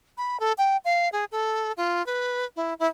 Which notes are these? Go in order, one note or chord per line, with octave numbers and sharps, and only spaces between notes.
B5
A4
G5
F5
G#4
A4
F4
B4
E4
E4